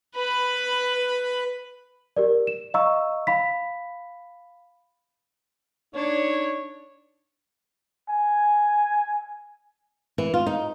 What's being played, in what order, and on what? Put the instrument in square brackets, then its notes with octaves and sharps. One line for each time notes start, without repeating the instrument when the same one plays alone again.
[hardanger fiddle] B4 B5
[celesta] G4 A#4 D5
E7
D#5 F5 A#5 C#6 E6
F5 B5 B6
[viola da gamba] D4 [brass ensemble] D#4 C#5
[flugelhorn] G#5
[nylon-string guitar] E3
F4
D#4